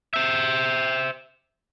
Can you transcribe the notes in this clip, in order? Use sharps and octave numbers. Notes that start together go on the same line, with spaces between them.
C5 E5